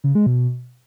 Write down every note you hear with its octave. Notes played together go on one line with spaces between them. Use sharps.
C#3
G#3
B2